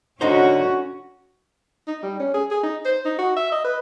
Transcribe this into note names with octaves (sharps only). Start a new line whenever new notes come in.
D3 C#4 D#4 F#4 C5
D#4
G3
C#4
G#4
G#4
D#4
C5
D#4
F#4
E5
D#5
B4